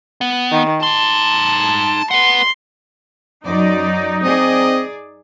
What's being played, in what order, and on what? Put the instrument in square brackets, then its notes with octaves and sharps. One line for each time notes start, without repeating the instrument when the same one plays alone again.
[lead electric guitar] B3
[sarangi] D#3
[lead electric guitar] D#4 C6 [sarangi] A5
[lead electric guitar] B4 F#5 [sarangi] C6
[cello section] F#2 F#3 D5 [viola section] D#4
[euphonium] C4 [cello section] G#4 D5 [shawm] D#5